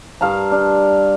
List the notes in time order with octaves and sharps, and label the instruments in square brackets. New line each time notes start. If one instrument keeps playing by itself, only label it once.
[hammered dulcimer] G2 F5 A5 A#5
D4